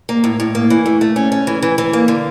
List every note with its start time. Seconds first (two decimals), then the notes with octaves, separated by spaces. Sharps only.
0.09 A#3
0.24 A2
0.40 A2
0.55 A#3
0.70 E3
0.86 A3
1.01 A3
1.16 C#4
1.32 C#4
1.47 E3
1.62 E3
1.78 E3
1.93 A#3
2.08 D3